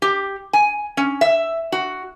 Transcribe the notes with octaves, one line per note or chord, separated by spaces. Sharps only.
G4
G#5
C#4
E5
F#4